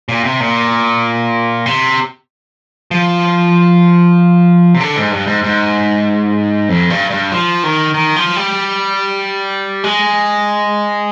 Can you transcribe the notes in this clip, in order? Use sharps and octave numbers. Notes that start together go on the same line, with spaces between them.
A#2
C3
A#2
C3
F3
C3
D3
G#2
G2
G#2
G#2
F2
G2
G2
F3
D#3
D#3
F3
G3
G#3